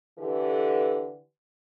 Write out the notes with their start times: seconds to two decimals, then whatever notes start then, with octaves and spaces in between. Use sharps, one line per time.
0.18 D3 E3 G4 A4 B4